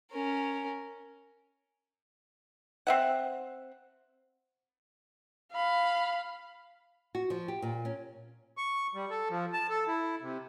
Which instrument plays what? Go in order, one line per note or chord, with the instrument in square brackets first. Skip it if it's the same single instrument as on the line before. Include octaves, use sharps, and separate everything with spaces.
[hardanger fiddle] C#4 A#4
[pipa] C4 E5 F#5
[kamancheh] F5 B5
[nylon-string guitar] F#4
F3
G4
A#2
C#4
[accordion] C#6
G3
A4
F3
A5
A4
E4
C3